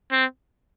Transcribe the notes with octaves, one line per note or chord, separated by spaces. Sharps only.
C4